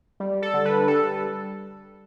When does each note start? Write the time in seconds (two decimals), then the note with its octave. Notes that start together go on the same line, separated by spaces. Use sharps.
0.20 G3
0.42 A4
0.54 D3
0.65 B4
0.87 G3 A4